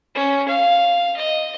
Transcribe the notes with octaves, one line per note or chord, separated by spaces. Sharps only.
C#4
F5
D#5